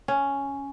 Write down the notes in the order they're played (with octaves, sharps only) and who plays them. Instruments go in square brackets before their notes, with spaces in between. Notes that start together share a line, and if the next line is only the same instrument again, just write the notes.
[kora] C#4